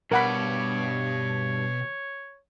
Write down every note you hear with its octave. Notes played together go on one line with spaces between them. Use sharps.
G2 B2 A#4 C#5 D5 F#5 B5